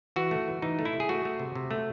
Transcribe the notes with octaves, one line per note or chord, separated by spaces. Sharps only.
E3 F#4
A3
E3
E3 D#4
A3
E4
C3
G#4
A3 F#4
A3
C3
C3
A3